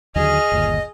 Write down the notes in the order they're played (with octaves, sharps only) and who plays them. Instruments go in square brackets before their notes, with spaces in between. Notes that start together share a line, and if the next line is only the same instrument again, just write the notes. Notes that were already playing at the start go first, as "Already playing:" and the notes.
[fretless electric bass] D#2 D3 F#3 [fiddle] G#4 F6 [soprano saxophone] D#5
[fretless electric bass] G1 D#2 A#2